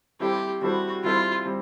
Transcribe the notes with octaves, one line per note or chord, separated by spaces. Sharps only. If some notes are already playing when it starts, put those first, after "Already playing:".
G3 C4 E4 G4 A4 C5
G3 C4 E4 F#4 A4 C5
G3 C4 E4 F4 A4 C5
G3 C4